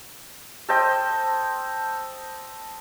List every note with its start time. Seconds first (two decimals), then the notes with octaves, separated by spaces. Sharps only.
0.69 A4 C5 D#5 G5